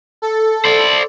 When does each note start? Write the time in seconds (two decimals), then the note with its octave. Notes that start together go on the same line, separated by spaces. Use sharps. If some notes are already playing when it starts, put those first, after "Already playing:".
0.22 A4
0.65 C5 D5